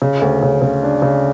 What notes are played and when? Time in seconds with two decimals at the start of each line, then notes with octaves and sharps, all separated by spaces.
0.02 C#3
0.21 D2
0.43 C#3
0.62 C#3
0.83 D4
1.02 C#3